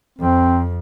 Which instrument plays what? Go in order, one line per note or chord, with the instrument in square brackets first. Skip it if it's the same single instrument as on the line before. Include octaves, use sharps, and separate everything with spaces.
[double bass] F2 [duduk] C4